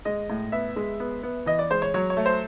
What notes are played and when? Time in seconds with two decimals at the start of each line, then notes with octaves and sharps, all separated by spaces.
0.05 G#3 D#5
0.30 A2
0.52 B3 E5
0.76 G#3
1.00 B3
1.23 B3
1.46 E3 D#5
1.59 D5
1.71 G#3 C5
1.82 C#5
1.94 F#3 C#5
2.10 C#5
2.17 A3
2.26 C5